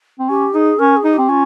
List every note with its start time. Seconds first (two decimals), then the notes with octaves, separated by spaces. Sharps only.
0.20 C4
0.29 C#4 G4
0.54 D#4 G#4
0.79 C#4 A#4
0.96 G#4
1.04 D#4
1.13 G4
1.19 C4
1.29 C#4 F4